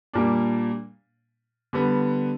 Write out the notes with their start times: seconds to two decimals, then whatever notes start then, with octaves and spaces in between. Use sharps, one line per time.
0.13 A#2 G3 A#3 D4
1.73 D3 G3 B3